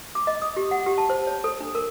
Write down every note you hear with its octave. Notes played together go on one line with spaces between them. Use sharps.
D6
D#5
D#6
G4
F#5
G4
A5
C5
C#5
A4
D4
A#4